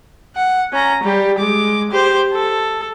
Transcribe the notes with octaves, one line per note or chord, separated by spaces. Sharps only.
F#5
C#4 A#5
G3 G4
G#3 D6
G4 C5
A4